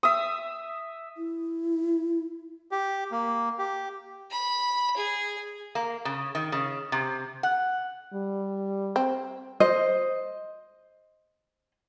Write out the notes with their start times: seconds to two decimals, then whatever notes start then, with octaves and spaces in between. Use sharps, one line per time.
0.03 E5 D#6
1.16 E4
2.71 G4
3.12 A#3
3.59 G4
4.31 B5
4.96 G#4
5.75 A#3
6.05 C#3
6.35 D#3
6.52 C#3
6.92 C3
7.43 F#5
8.14 G3
8.96 C4
9.60 C5 D#5